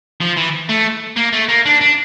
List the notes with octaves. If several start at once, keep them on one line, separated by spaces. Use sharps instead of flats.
F3
E3
A3
A#3
A3
A#3
D4
D4